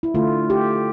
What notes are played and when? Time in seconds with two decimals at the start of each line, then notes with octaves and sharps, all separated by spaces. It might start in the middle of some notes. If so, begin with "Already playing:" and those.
0.03 E4
0.15 D3 A3 F4
0.50 G4